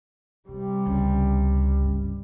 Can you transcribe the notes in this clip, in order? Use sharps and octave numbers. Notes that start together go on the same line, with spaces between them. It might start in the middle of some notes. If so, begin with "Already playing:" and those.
C3 D#3 G3
C#2 D3
G2 C#3